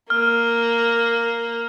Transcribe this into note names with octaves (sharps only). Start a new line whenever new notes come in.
A#3 F6